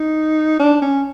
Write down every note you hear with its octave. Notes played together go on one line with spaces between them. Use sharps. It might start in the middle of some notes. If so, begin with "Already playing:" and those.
Already playing: D#4
D4
C#4